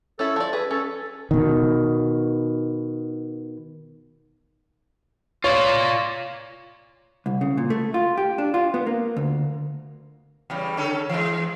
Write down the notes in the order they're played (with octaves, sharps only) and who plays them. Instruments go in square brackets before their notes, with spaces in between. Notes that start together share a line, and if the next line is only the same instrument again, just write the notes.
[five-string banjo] C#4 E4 [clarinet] A4
[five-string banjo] F3 D5
[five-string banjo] G#4 [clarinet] B4
[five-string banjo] C#4 [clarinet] A4
[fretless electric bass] B2 D#3
[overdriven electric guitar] F4 D5 [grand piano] C#5
[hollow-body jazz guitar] C2
C#3
A#2
A3
F4
G4
D4
F4
B3
A#3
D2
[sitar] E2 C#3 G3
D3 C#4 A4
E3 G#3